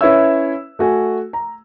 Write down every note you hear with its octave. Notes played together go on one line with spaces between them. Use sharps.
C#4 E4 B4 C#5 E5 E6
A3 F#4 G#5
A#5